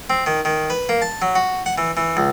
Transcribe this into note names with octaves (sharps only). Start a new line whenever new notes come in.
C4
D#3
D#3
B4
A#3
A5
F#3
F#4
F#5
E3
E3
C#2